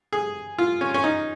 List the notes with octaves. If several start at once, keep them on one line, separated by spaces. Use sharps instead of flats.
G#4
F4
C#4
C#4
D#4